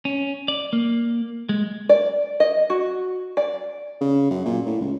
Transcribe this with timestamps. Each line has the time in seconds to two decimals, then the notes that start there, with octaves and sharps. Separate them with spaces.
0.05 C#4
0.48 D5
0.73 A#3
1.49 G#3
1.89 D5
2.40 D#5
2.70 F#4
3.37 D5
4.01 C#3
4.31 F#2
4.46 A#2
4.66 A2
4.81 C#2